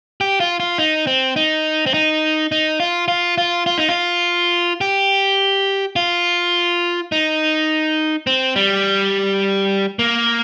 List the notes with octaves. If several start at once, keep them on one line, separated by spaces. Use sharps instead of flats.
G4
F4
F4
D#4
C4
D#4
C4
D#4
D#4
F4
F4
F4
F4
D#4
F4
G4
F4
D#4
C4
G3
A#3